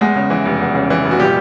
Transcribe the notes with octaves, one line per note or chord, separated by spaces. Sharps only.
E2 G#3 G#4
C#3
E3
F1
E2
C#3
E3
F1
F#4
A#2 G3 G4